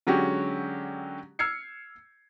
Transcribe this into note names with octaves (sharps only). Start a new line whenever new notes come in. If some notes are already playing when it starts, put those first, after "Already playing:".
D3 F#3 G#3 C#4 F#4 G4
E6 F6 G#6 C7 C#7